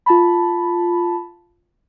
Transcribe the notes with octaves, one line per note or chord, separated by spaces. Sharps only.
F4 A5 B5